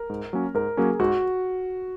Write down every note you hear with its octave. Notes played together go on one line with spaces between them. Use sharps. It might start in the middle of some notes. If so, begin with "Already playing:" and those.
Already playing: A#4
G#2
F#3 A#3 C#4
G#2 A#4
F#3 A#3 C#4 G#4
G#2 F#4